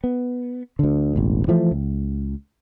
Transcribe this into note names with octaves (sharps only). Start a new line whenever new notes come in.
B3
D2 D3
E1 A1
E3 F3 A3
C#2